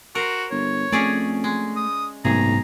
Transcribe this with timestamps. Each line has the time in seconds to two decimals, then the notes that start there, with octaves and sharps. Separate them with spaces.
0.15 F#4 A#4 C5
0.51 G1 C#5
0.92 F2 A3 C#4 G#4 D5
1.44 G#3
1.76 D#6
2.25 B1 G#2 C3 A3 G#4 A#5